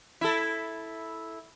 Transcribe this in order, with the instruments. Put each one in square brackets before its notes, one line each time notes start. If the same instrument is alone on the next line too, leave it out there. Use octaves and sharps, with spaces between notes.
[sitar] E4 A4